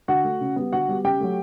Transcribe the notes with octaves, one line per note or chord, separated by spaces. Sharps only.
D3 F#4 F#5
A3
C#3
G3 B3
D3 F#4 F#5
G3 B3
C#3 G4 G5
F#3 A3